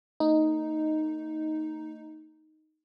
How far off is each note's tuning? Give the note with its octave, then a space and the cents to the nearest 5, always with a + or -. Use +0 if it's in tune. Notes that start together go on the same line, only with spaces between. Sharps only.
A3 +45 D#4 +0